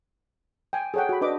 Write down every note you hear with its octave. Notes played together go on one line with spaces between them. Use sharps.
G5 G#5
G#4 A4 C#5 F#5 G5
F#4 B5
D4 B4 D#5 D6